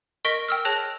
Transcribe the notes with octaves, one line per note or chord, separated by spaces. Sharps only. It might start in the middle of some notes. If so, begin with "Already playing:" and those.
A#4 D#5 C#6 A#6 B6 D7
G5 E6 F6
G#4 C#5 A5 F#6 A#6 F7